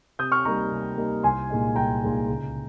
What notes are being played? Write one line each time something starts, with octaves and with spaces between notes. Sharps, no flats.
C3 D#6 G6
C#6 F6
G3 A#3 D#4 A#5 C#6
C3
G3 A#3 D#4
C2 G#5 C6
A#2 G#3 D#4
C2 G5 A#5
A#2 G#3 D#4
C#2